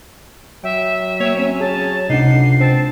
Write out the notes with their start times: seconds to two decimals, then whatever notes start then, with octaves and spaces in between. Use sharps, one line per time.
0.64 F#3 E5 G5
1.20 A#3 C#5 G5
1.37 C4 C#4
1.60 G#4 C#5 A5
2.09 C#2 C3 D4 D#4 F#5 C7
2.60 C4 A5